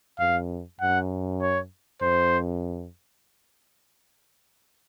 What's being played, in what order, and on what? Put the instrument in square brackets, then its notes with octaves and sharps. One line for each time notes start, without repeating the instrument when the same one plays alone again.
[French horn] F2 [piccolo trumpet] F5
[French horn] F#2 [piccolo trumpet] F#5
[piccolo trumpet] C#5
[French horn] F2 [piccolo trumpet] C5